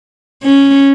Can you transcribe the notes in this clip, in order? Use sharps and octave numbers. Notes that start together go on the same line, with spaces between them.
C#4